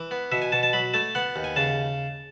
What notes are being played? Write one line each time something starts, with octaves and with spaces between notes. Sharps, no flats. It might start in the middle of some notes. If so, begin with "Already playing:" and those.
Already playing: E3
B3
B2 E5
G#5
B2 A5
A5
F#3 B5
A3 A5
B3 F#5
D#2
G#5
C#3 A5